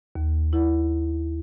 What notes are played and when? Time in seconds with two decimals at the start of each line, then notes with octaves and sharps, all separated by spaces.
0.15 D#2
0.53 E4